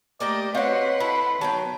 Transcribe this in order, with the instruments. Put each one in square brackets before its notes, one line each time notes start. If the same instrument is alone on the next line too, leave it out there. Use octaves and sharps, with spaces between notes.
[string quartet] A3 D#5 [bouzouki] A#3 G4 G5 [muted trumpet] D5
[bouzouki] C4 C#5 [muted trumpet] F#4 [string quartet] B4 F#5 C6 [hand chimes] D#5 F5
[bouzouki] A3 E4 [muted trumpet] B5
[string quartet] D#3 [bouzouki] F#3 B3 G5 [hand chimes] A5